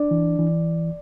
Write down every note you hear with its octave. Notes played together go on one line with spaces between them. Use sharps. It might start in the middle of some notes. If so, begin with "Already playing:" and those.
Already playing: D4 D5
E3
E3